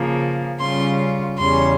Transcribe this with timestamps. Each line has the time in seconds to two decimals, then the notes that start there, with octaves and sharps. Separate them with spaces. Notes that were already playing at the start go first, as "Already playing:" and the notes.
Already playing: C#3 F3 A#3
0.59 C#3 G3 C#4 F4 C6
1.39 E2 C#3 G3 C#4 C6